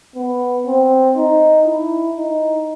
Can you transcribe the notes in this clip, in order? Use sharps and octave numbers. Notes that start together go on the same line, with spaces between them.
B3
C4
D#4
E4
D#4